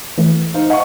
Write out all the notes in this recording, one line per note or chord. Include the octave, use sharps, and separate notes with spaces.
E3 A3
D#4 C5 F5
D#5 F5 F#5 C#6